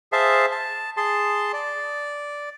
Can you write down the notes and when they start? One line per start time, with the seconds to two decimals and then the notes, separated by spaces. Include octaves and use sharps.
0.12 G#4 C5 E5 F5 A5
0.52 A5
0.97 G#4 A5 C6
1.53 D5